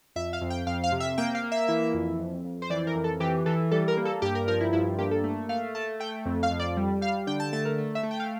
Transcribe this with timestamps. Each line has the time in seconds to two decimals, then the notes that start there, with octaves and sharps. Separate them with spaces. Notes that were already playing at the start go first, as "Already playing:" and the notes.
0.16 F2 E5
0.33 F5
0.41 F2
0.50 G5
0.67 F2 F5
0.84 F5
0.92 C3
1.00 E5
1.18 A#3 G5
1.35 F5
1.44 A#3
1.52 E5
1.68 E3
1.94 F2
2.19 F2
2.44 F2
2.62 C5
2.70 E3 D5
2.87 A#4
2.95 F2
3.04 A4
3.20 E3 G4
3.46 E3 A4
3.71 G3 A4
3.88 A#4
3.97 A#3
4.05 A4
4.22 G2 G4
4.35 A#4
4.48 F3 A#4
4.60 E4
4.73 G2 E4
4.99 A#3 G4
5.11 A4
5.24 A3
5.49 A3 F5
5.75 A3 A5
6.00 A3 G5
6.26 F2
6.43 F5
6.51 F2
6.60 D5
6.77 G3
7.01 G3 F5
7.27 D3 G5
7.40 A5
7.53 A3 A5
7.65 A#4
7.78 A3
7.95 E5
8.03 A3
8.11 G5
8.20 F5